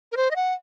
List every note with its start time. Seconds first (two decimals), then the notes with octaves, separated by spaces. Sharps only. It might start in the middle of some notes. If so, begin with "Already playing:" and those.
0.12 A#4
0.17 C5
0.31 D#5
0.36 F#5